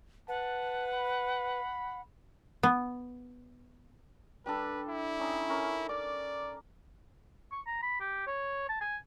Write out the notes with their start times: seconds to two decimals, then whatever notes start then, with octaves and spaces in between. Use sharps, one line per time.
0.28 B4 F#5 A5
0.93 B5
2.63 B3
4.46 G3 D4 A4 B4
4.88 E4
5.19 C#4 D#4
5.49 C#4 A4 A#4
5.89 D5 D6
7.52 C#6
7.67 A#5
7.82 B5
8.00 G4
8.27 C#5
8.69 A5
8.81 G#5